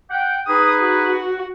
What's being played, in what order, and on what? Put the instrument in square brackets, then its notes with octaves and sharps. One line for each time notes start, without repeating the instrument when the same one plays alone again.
[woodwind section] F#5 G5
[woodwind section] D#4 G#4 B4 [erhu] D#6
[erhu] F#4